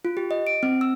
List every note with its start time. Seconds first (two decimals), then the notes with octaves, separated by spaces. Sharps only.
0.05 F4
0.17 G4
0.31 D#5
0.47 D7
0.63 C4
0.81 E6